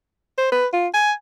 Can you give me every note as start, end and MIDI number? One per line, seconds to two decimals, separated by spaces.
0.38 0.49 72
0.52 0.67 71
0.73 0.88 65
0.94 1.12 80